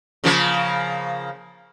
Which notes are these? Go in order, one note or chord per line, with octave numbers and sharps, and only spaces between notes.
C#3 F3 A#3